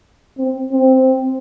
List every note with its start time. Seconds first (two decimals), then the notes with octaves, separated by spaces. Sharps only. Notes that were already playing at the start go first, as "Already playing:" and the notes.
0.38 C4
0.72 C4